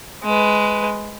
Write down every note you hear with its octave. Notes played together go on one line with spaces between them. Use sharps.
G#3 B4